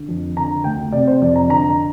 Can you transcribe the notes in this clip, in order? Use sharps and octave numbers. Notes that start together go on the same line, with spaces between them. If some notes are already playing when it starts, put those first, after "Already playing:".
Already playing: D3
F2
D3 A#5
D2 G5
C3 D5
C5
F2 D5
A#5
D3 A#5